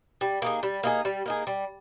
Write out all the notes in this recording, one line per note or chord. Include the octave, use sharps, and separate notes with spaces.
G3
A#3 D#4 G#4
G3
A#3 D#4 G#4
G3
A#3 D#4 G#4
G3